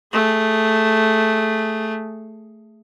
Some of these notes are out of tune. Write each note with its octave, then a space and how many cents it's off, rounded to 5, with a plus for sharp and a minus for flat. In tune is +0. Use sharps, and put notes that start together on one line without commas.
A3 +0 G#4 +0